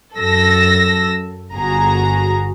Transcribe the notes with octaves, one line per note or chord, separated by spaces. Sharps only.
F#2 A4 E6 A#6
G1 F#4 G#4 A#5